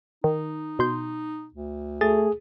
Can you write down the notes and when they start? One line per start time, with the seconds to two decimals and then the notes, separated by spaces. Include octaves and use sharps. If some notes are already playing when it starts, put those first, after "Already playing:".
0.24 D#3 D#4
0.79 B2 C6 G6
1.54 D2
2.01 A3 G#4 A6